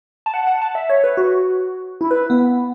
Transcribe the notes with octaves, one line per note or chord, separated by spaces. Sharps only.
A5
F#5
F#5
A5
E5
C#5
B4
F#4
E4
B4
B3